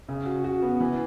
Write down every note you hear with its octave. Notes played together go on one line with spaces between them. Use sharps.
C#3
F#4
F#4
B3
E3